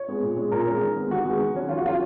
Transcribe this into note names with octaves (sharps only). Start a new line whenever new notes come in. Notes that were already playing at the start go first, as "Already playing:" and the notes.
Already playing: C#5
G#3 B3
A#2
G#3 C#4
A#2 A#4
G#3 C#4
D#3
G#3 B3
D#3 F#4
G#3 B3
D#3
F#3 C#4
D#3 F4
F#4
F#3 C#4 F4